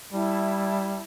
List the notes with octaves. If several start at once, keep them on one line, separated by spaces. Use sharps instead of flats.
G3 E4 A5